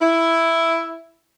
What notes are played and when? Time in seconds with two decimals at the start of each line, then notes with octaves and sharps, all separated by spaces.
0.01 E4